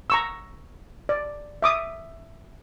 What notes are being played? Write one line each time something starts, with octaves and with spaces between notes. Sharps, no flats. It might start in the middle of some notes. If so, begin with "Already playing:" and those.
A#5 C#6 E6
D5
E5 D6 D#6